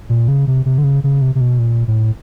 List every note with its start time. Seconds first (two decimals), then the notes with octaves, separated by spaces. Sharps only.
0.10 A#2
0.28 C#3
0.47 C3
0.66 C3
0.78 D3
0.84 C#3
1.04 C#3
1.22 C3
1.35 C3
1.41 B2
1.59 A#2
1.88 A2